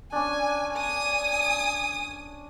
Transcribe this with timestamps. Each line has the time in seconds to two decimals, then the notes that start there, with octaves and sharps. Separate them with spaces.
0.12 C#4 D4 G#5
0.74 G#5 D#6